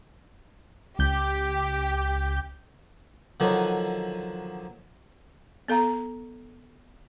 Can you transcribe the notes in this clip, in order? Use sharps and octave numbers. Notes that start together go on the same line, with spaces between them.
C#2 G4 G6
D3 D#3 F3 F#3 D4 D#4
B3 A4 F5 A#5